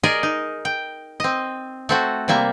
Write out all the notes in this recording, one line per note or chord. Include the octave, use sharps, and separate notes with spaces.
G#4 A#4 D5 D#5
D#4
G5
C4 D#5
A3 C4 F#4
C3 G3 A#3 E5